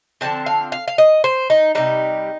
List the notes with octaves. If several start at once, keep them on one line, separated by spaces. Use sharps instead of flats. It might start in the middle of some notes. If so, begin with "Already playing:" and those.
D3 F3 C4 A5
F5
F5
F5
D#5
C5
D#4
C3 D#3 G3 D#4